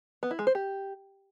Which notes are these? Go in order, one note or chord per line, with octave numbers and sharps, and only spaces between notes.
B3
E4
G#3
C5
G4